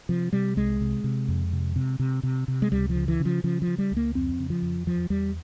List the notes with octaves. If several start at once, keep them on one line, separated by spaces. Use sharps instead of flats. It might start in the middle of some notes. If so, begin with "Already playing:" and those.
C3 F3
C3 G3
C2 G#3
C3
C3
F2
C3
C3
C3
C3
C3
G#3
C#2 G3
F3
C#3
E3
C#3
F3
C#3 F3
F3
C#3
G3
C#2
A#3
F2 C4
C#3
F3
F2
E2 F3
E2 G3